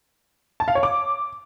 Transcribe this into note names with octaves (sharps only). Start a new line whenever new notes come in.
A5
F5
C#5
D6